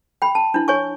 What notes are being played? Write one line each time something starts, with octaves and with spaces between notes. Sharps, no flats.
G5 B5
A5
D4 E4
C#5 G#5 C#6